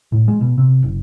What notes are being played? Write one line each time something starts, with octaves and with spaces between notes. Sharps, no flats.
A2
G#3
B2
C3
F#1